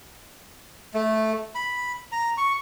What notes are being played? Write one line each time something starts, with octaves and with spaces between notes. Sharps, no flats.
A3
B5
A#5
C#6